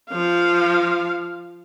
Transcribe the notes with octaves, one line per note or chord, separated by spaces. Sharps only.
F3 F5